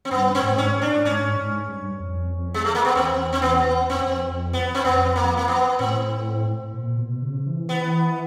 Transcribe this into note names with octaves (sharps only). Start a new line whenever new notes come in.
C4
G2 B3
C4
G#2
C#4
A2
D4
G#2 C#4
G#2
G2
F2
G#3
A3
A#3
B3
E2 C4
C4
B3
F2 C4
B3
C4
F2 B3
A#3
A#3
B3
A2 C4
A#2
B2
C#3
E3
B3